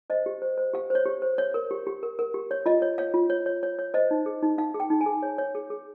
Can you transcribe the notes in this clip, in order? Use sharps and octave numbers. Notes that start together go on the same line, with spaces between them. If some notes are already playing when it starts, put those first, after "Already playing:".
C5 D#5
G4
C5
C5
G4 F5
C5 C#5
G4
C5
C#5
A#4
G4
G4
A#4
A#4
G4
C#5
F4 D#5
C#5
C#5 F5
F4
C#5
C#5
C#5
C#5
C5 D#5
D#4
G#4
D#4
D#4 F5
G#4
G5
D#4
G#5
G#4
C#5
C#5
G#4
G#4